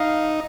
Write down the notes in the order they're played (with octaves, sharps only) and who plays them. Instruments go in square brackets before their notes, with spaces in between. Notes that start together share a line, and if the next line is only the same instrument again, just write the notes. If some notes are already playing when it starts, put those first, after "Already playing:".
Already playing: [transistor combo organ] D#4 [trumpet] F5